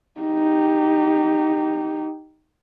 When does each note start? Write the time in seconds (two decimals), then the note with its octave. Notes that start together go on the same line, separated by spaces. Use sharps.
0.21 D#4 G4